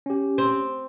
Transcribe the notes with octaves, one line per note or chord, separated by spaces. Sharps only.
C#4 G4
C4